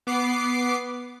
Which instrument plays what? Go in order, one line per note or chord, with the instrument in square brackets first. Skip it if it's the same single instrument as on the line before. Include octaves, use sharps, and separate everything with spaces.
[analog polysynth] B3 D6 C7